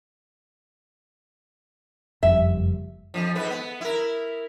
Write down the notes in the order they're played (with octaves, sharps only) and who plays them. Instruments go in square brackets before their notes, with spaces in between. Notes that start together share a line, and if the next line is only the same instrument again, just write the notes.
[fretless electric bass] F#1 F2 G3 [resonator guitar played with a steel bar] E5
[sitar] F2 A2 F3
G#2 B4
B3
E4 A#4